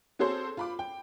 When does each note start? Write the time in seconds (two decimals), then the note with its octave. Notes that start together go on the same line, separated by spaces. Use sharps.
0.19 C4 F#4 G#4 A4 C5 C#5
0.57 F4 B5 D6
0.79 G5